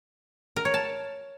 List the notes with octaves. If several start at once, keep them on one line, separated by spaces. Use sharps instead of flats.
A#4
C#5
A5